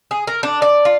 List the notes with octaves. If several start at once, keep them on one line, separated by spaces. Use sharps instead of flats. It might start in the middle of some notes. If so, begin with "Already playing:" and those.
G#4
A#4
D4
D5
F4